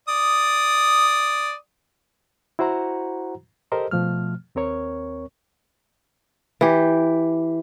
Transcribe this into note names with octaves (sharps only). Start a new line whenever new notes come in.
D5 D#6
E4 F#4 C5 F#5 A#5
G4 A4 A#4 C5 D#5
B2 F3 A3 F6
D#2 C4 A#4 C#5 C#6
E3 G4